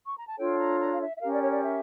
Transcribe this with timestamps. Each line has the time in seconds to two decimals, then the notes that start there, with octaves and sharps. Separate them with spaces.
0.06 C#6
0.17 A#5
0.27 A5
0.38 D4 F4 A4 C#5 G5
0.58 A#5
0.79 A#5
0.92 F5
1.00 E5
1.16 E5
1.20 C#4 G4 A#4 F5
1.30 D5
1.40 C#5
1.51 D5
1.62 E5